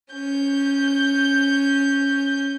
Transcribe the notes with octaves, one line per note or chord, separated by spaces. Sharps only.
C#4 G6